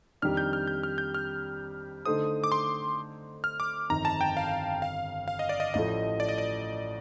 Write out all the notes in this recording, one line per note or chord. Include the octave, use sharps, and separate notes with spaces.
F2 D#3 G3 D4 G4 F6
G6
F6
G6
F6
G6
F6
D3 A3 D#4 A4 C5 D#6
D6
C6
F6
D6
G1 F2 D#3 A#5
A5
G5
F5
F5
F5
D#5
D5
D#5
A1 A2 F3 A3 D#5
D5
D#5
D5